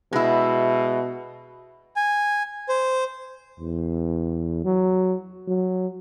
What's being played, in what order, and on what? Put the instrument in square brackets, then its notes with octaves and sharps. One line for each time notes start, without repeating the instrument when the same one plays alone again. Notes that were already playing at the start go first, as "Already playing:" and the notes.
[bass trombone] B2 [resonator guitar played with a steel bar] G#3 E4
[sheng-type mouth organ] G#5
C5
[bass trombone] E2
F#3
F#3